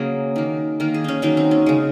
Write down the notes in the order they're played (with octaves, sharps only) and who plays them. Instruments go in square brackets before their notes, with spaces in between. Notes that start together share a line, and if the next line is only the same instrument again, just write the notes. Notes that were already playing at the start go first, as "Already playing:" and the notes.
Already playing: [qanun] C#3 F#3 A#3 G#4
D#3 A#3
D#3 A#3 A#4
G#4
C#4 D#4
D#3 F#3 A#3 D#4
C4
C#4
C#3 G#3